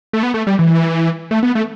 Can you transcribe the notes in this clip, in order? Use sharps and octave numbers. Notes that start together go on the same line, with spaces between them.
A3
B3
A3
G3
E3
A3
B3
A3